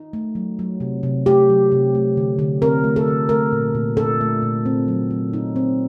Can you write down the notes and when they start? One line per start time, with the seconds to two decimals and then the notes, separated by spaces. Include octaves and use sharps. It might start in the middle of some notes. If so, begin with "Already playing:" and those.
Already playing: D#4
0.13 A3
0.35 F#3
0.59 F#3
0.80 C3
1.03 C3
1.26 A3 G4
1.49 F#3
1.72 C3
1.95 A3
2.17 D3
2.39 D3
2.62 C4 A#4
2.84 A3
2.96 A4
3.08 D3
3.29 A3 A#4
3.52 A#2
3.75 A#2
3.97 D4 A4
4.21 A3
4.42 A#2
4.65 C4
4.88 F#3
5.11 F#3
5.33 D#4
5.56 C4